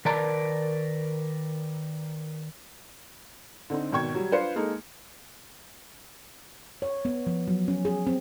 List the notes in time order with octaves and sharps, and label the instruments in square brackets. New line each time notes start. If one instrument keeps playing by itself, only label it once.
[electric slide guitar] D#3 A#4 B4 D5 A5 A#5
[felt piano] D3 C4 D#4
G#1 B2 D#3 G5 C#6 G#6
F#3 G3
D4 F4 B4 C5 F5 C#7
G#3 A#3 D#4 A4
[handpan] C#5
B3
F3
F#3
C#4
G#4
C4